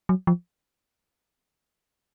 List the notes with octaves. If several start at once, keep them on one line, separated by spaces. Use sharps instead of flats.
F#3
F3